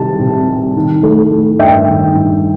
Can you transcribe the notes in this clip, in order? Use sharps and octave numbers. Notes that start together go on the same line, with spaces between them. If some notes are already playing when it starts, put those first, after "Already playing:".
Already playing: C3 D#3 G3 A5
C3
G3
D#3
A3
A3
G2 E5 G5
D#3
G2